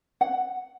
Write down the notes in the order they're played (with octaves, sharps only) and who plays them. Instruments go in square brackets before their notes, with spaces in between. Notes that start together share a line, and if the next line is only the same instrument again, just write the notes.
[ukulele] F#5